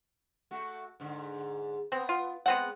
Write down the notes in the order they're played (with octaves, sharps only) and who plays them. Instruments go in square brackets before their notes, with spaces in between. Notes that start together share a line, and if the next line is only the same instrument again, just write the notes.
[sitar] A3 F#4
G#2 D3
[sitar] B3 [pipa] C4
[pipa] F4
[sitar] G#3 [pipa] B3 C4 F#5